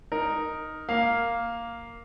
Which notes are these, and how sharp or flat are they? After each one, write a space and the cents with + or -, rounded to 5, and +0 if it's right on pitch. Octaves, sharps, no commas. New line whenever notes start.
D#4 +0 A#4 +0
A#3 +0 F5 +0